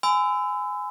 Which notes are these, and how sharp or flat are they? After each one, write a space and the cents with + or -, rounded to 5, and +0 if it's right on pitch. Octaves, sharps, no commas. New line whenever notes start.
G#5 +0 B5 +45 E6 +0